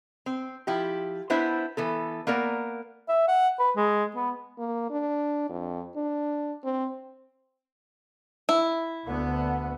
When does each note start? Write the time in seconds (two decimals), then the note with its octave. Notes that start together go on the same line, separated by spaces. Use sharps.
0.26 C4
0.67 F3 E4 G4
1.30 B3 D4 E4 C5 E5
1.77 E3 B3 A4
2.27 A#3 B3 A#4 D5
3.08 E5
3.28 F#5
3.59 B4
3.77 G#3
4.15 B3
4.58 A#3
4.90 D4
5.49 F2
5.96 D4
6.64 C4
8.49 E4
9.05 D2 B3